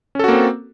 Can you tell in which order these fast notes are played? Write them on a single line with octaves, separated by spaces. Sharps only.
C#4 A4 F#4 A#3 C4